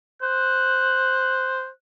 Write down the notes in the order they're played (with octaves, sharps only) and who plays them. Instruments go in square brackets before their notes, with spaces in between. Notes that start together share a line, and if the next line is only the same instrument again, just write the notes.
[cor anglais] C5 [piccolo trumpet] F#6